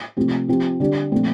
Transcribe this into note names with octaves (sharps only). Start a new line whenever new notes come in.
C3 F3 A3 C4 G4
F3 C4 G4
D3 G3 D4 G4
A#2 F3 A3 C4